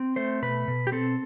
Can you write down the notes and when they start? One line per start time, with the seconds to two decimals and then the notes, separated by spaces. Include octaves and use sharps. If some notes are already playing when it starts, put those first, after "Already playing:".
Already playing: C4
0.16 A3 C5
0.42 B2 B4
0.68 B2
0.87 G4
0.92 C4 A4